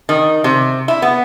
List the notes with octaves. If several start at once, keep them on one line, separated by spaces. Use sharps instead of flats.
D#3
C3
E4
B3